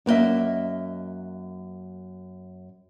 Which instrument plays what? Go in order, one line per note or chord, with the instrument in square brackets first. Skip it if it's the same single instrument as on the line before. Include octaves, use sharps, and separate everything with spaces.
[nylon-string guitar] F#2 A#3 D4 D#5 E5